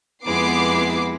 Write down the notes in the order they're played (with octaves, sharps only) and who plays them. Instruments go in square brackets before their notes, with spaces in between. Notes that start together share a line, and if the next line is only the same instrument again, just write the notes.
[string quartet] F2 G#3 E4 [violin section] B3 D6 C7